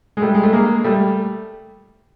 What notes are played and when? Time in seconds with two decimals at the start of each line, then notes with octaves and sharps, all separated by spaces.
0.17 G#3
0.22 G3 A3
0.35 G#3
0.43 A3
0.53 G#3 A#3
0.84 G3 A3